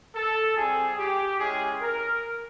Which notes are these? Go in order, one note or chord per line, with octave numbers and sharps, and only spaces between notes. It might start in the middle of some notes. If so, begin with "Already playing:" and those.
A4
G3 C4 F4 G#4
G4
G#3 C#4 E4 G4 G#4
A#4